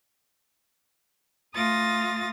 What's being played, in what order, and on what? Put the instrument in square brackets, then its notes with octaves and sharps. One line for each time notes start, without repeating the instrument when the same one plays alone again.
[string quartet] A3 F4 D#6 A6 A#6